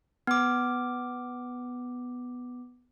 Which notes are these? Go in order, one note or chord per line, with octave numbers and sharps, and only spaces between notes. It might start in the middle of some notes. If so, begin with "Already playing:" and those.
B3 D6